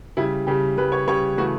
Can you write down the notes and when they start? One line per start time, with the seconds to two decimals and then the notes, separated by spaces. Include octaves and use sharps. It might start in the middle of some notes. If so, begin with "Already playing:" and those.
0.17 C#3 G3 E4
0.47 C#3 G3 G4
0.77 C#3 G3 B4
0.92 C#5
1.07 C#3 G3 C#5
1.37 C#3 E3 A3 F#4